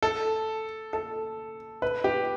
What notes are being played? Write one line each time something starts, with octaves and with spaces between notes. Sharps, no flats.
A4
A4
B4
G4